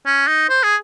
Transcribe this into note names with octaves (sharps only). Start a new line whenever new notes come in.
C#4
D#4
C5
G#4